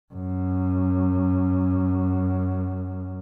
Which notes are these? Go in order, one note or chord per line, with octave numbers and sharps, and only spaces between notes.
F#2